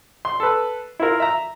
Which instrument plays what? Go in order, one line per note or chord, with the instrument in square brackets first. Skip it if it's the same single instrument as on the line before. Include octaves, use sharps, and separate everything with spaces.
[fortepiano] C6
A4 B4
E4 F4 A#4
E5 A#5